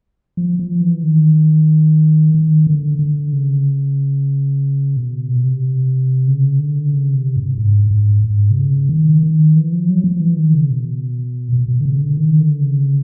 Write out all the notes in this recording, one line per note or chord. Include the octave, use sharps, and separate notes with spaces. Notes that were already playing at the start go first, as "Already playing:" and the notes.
F3
F3
E3
D#3
D#3
D3
D3
C#3
B2
C3
B2
C3
C#3
D3
C#3
C3
G2
G#2
G#2
G#2
C3
C#3
D#3
D#3
E3
F3
F#3
F3
E3
D#3
C#3
B2
B2
B2
D3
C#3
D3
D#3
D3
C#3